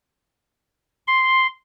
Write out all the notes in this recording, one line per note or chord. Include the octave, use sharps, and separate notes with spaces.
C6